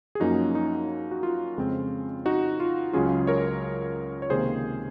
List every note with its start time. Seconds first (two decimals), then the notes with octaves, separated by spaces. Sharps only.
0.15 G#4
0.20 F#2 F3 A#3 C#4 D#4 F#4
0.55 D#4
1.11 F#4
1.23 F4
1.58 F2 C#3 G#3 C4
2.26 D#4 F#4
2.60 F4
2.93 C#2 C#3 F#3 C#4 F4 G#4
3.27 A#4 C#5
4.22 C#5
4.30 C#2 C3 D#3 A#3 G#4 C5